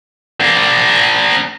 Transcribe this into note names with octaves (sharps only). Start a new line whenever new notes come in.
A#3 D4